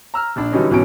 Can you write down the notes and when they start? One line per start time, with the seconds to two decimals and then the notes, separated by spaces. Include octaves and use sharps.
0.14 A#5 E6 F6
0.36 A#1 D4
0.52 D3 E3 F#3 G3 C#4 D#4
0.71 G#1 B2 E3 F#3 C#4 D7